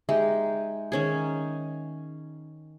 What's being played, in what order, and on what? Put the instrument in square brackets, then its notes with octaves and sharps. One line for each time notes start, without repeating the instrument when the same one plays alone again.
[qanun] G#3 D#4 G4 [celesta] E5
[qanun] D#3 C#4 G#4